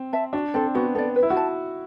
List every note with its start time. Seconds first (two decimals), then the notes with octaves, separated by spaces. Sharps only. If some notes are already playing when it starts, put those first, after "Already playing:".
Already playing: C4
0.13 E5 A5
0.33 D4 F#4
0.54 C4 A4 D5
0.75 B3 F#4
0.95 B3 A4 D5
1.16 B4
1.23 E4
1.30 F#4
1.37 A5